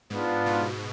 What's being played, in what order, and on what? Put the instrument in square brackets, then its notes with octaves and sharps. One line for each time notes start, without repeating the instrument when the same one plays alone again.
[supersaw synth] G#2 [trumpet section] B3 D4 F4
[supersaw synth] B2